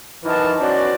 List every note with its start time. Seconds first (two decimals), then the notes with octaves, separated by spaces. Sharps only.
0.24 F#2 E3 F3 D#4 A#4 A5
0.59 B3 C#4 F#4 C5 D5